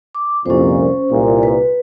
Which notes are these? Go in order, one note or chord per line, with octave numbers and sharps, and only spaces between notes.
D6
C2 F2 A#2 C#4 C5
C2 A#2
B4